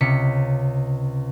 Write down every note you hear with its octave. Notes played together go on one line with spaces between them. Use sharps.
C#2 C3 C#4 B6 C#7